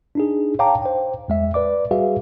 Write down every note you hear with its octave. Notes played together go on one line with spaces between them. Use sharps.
D4 D#4 G#4
C#5 F5 G5 A5 A#5 D6
C5 G5
E2 G#3 E5
B4 D5 D6
G3 F#4 G#4 B4 E5 F5